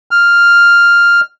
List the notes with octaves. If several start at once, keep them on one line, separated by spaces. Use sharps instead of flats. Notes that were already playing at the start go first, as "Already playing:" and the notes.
F6